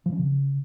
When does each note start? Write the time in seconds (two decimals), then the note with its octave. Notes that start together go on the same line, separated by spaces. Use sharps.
0.06 F3
0.12 C#4
0.19 C#3